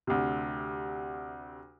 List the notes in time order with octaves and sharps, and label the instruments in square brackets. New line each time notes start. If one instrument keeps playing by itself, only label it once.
[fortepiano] D2 C3